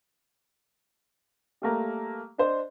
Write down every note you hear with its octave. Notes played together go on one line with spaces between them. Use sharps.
G3 A3 A#3
D4 C5 D#5